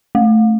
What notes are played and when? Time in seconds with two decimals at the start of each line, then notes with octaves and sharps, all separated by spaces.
0.15 A3